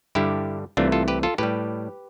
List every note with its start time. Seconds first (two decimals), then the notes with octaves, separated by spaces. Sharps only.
0.15 G2 D3 G3 E4 G4
0.77 C2 C3 E3 A3 D4 F4
0.92 F4 A4
1.08 G4 B4
1.23 F4 A4
1.38 A2 G3 G4 B4